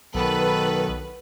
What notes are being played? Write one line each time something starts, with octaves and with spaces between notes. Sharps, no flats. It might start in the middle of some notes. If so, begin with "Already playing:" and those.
B1 D#3 B3 A4 B4